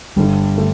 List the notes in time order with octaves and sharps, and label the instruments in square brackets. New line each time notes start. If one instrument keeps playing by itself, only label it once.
[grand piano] G1 G2 D3 G3
D3 A3